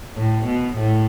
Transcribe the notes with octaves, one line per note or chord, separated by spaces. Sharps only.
A2
B2
A2